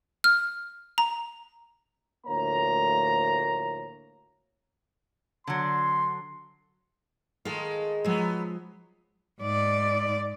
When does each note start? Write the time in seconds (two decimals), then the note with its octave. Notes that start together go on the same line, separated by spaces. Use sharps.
0.24 F6
0.98 A#5
2.26 D2 A2 F3 A#3 C#5 A#5
5.47 D3 F#3 C6
7.45 D#3 G#3 A4 F5
8.04 F3 F#3 G#3 B3
9.42 G#2 D5